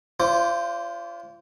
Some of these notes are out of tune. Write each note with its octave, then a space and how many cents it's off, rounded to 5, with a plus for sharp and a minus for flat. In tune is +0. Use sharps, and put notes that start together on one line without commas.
D4 -40 F4 -30 C5 +0